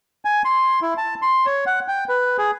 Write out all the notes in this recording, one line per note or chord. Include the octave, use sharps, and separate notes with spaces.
G#5
C6
E4
A5
C6
C#5
F#5
G5
B4
G#4